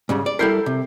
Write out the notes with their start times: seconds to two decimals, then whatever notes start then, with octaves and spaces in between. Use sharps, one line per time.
0.09 G#2 C#3 G3
0.26 D5
0.39 G3 E4 A4 A#4 G6 C7
0.66 C3